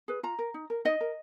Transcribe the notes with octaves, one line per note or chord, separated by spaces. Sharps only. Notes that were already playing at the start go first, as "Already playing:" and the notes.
G#4 B4
F4 A#5
A#4
D#4
A#4
D#4 D#5
A#4